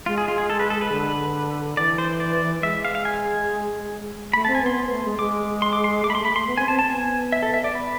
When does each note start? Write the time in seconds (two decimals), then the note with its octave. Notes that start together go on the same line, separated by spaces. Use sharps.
0.06 G#3 F4
0.18 G#4
0.28 F4
0.38 G#4
0.50 A4
0.60 B4
0.70 A4
0.81 B4
0.92 D3
1.77 E3 D5
1.98 C5
2.20 D5
2.63 G#3 E5
2.85 F5
2.95 F5
3.05 G#5
4.33 A3 B5
4.45 A5
4.47 C4
4.55 G#5
4.62 B3 C6
4.76 B3
4.91 A3
5.04 G#3
5.19 G#3 D6
5.62 C6
5.73 D6
5.84 C6
6.04 A3 D6
6.10 B5
6.15 C6
6.18 A3
6.25 B5
6.32 A3 C6
6.47 B3
6.57 C4 G#5
6.68 C4 A5
6.79 A5
6.90 B3 G#5
7.32 E5
7.42 A4
7.54 E5
7.64 D5
7.75 B4